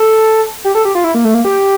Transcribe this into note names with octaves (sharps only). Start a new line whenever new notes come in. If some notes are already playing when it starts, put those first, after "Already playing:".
Already playing: A4
G4
A4
G4
F4
E4
A#3
A3
A#3
G4